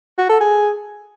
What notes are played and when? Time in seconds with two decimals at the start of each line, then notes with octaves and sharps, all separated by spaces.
0.18 F#4
0.29 A4
0.41 G#4